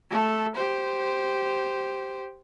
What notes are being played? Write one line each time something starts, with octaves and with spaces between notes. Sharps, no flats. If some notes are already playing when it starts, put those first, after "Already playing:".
A3 A4
G4 C5